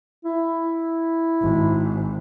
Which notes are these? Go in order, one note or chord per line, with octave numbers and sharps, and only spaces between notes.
E4
G#1